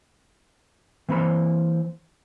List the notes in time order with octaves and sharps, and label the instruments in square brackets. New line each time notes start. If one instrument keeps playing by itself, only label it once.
[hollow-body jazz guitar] E3 A#3 C4 C5 B5